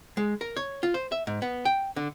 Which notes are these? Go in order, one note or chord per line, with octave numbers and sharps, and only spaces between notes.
G#3
A#4
C#5
F4
C5
E5
G#2
B3
G5
D3